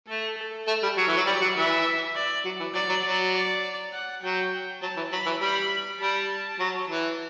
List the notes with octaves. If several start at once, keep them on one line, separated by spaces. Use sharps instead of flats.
A3 A4
A4
A3
G3
F#3 C#5
E3
F#3
G3 D5
F#3
E3 E5
D5
F#3
E3
F#3 D5
F#3
F#3
D5
F#5
F#3 G5
F#3 A5
E3
F#3 B5
E3
G3 B5
G3 A5
F#3
E3